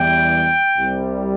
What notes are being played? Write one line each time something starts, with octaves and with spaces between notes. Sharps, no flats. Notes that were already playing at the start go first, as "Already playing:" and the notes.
Already playing: E2 E3 G3 G5
C2 C3 G3